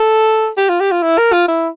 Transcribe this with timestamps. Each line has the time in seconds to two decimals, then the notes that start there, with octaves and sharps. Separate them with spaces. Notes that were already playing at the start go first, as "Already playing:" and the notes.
Already playing: A4
0.57 G4
0.69 F4
0.80 G4
0.91 F4
1.02 E4
1.18 A#4
1.32 F4
1.48 E4